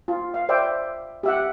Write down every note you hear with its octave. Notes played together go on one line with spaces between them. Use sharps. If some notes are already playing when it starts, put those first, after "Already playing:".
F4
F5
C5 D5 E5 G5
G4 E5 F#5